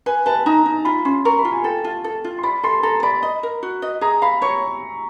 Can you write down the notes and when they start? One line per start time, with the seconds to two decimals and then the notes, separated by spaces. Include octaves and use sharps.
0.06 B4 G#5
0.26 B4 A5
0.46 D#4 A#5
0.66 D#4
0.85 F4 B5
1.05 C#4 C6
1.25 A#4 C#6
1.39 B5
1.45 F4
1.52 G#5
1.64 A4 G5
1.84 F4 A5
2.04 A4
2.25 F4
2.39 C6
2.43 D5 B5
2.63 A4 C6
2.83 A4 A#5
3.03 D5 B5
3.23 D#5
3.43 A#4
3.63 F#4
3.82 D#5
4.01 G#4 A#5
4.22 F5 B5
4.42 C#5 C#6